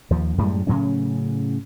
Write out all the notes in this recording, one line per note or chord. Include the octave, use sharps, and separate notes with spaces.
D#2 F3
F#2 A2 G3 G#3
A2 C#3 F#3 C#4